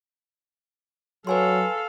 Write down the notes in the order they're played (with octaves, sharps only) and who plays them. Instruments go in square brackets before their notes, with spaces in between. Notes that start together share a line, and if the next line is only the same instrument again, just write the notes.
[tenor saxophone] F#3 [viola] A4 F5 [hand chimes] B4 G#5 C6